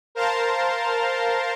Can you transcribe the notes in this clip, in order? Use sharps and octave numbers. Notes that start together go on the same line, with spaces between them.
A#4 C5 F5 A5 A#5 C6